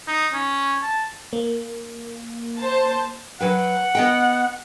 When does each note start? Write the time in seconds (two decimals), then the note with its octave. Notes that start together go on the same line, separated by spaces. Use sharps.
0.08 D#4
0.33 C#4
0.82 A5
1.33 A#3
2.59 C5 A5
3.40 F#3 B4 F#5 G5
3.95 B3 D#5 G5